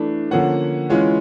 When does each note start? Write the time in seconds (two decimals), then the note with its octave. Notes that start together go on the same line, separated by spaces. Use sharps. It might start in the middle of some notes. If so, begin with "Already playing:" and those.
Already playing: E3 A3 D4
0.31 D3 F3 A#3 C#4 F#5
0.90 E3 G#3 C#4 F4